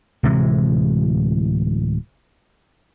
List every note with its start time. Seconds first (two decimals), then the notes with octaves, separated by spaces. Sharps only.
0.23 D1 C3 E3 G#3